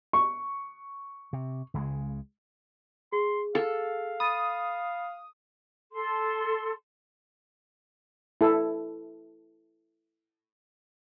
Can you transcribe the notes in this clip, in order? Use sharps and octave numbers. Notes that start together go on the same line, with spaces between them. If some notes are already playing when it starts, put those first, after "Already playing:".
C#6
C3
C#2 C#3 G#3
G#4 C6
A4 F5
B5 D#6 A6
A4 C6
E4 A4